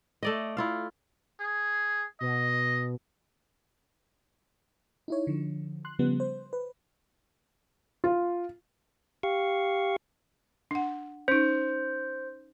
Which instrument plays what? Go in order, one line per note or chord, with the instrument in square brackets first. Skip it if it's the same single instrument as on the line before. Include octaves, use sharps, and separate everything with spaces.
[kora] A3 D5 D#5
E4 F4 F5
[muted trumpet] G#4
[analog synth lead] B2 [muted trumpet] D#5
[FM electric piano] D#4 E4 C#5
D3 F3
C6 F#6
C#3 F3 G3 B3
C5
B4
[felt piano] F4
[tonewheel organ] G4 F5 C#6
[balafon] D4 F#5
[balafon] C#4 D#4 [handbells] C5